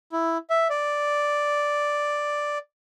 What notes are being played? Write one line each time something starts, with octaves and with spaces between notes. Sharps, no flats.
E4
E5
D5